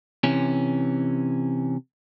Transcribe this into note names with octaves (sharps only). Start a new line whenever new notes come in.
C3 E3 C#4